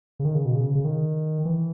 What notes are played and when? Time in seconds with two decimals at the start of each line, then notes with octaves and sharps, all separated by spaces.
0.19 C#3
0.25 D#3
0.35 C#3
0.45 B2
0.55 C#3
0.75 C#3
0.85 D#3
1.45 E3